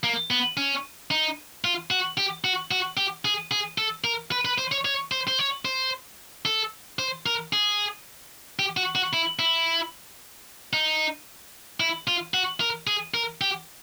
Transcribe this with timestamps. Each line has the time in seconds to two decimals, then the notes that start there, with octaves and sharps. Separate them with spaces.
0.04 A#3
0.31 B3
0.57 C#4
1.11 D#4
1.65 F4
1.91 F#4
2.17 G4
2.44 F#4
2.71 F#4
2.97 G4
3.25 G#4
3.51 G#4
3.78 A4
4.04 A#4
4.31 B4
4.45 B4
4.58 C5
4.72 C#5
4.85 C#5
5.12 C5
5.28 C5
5.39 C#5
5.65 C5
6.45 A4
6.99 C5
7.26 A#4
7.53 G#4
8.59 G4
8.77 F#4
8.95 F#4
9.13 E4
9.39 E4
10.73 D#4
11.80 E4
12.08 F4
12.34 F#4
12.60 A#4
12.87 G#4
13.14 A#4
13.41 G4